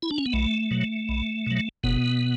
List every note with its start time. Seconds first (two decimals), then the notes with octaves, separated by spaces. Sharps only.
0.02 E4
0.11 D4
0.18 C#4
0.26 B3
0.33 B1 A3
0.71 B2 F#3
1.09 B1
1.46 B2 F#3
1.83 F#1 B2 B3